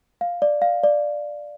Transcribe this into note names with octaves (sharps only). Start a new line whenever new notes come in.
F5
D5
F5
D5